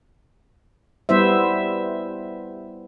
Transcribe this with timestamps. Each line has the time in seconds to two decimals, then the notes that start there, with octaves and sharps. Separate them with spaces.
1.09 G3 B3 E4 C5 E5